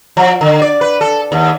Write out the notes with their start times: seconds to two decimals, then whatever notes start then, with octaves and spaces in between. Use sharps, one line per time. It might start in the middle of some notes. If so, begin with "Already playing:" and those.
0.17 F3
0.41 D3
0.62 D5
0.81 B4
1.01 A4
1.32 D#2